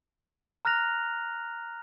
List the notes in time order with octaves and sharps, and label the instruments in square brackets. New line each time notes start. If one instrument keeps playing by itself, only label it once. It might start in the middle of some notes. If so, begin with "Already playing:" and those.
[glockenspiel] A#5 F6 F#6 A#6 F7